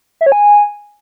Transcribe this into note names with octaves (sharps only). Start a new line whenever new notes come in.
E5
C#5
G#5